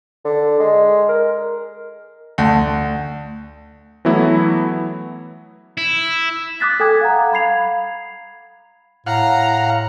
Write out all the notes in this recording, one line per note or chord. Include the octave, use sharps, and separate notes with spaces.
D3
G#3
A#4
D2
E3 F#3 A3 B3 E4
E4
D6 D#6 F#6 A6 B6
A4 G5 G#5 D#6 G#6
F5 F#5 A#5
F5 B5 G#6 C7 F7
A2 F5 F#5 A#5